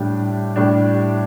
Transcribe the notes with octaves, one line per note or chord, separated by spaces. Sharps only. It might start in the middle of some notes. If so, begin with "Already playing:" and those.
Already playing: A2 G3 D4
A2 G3 D4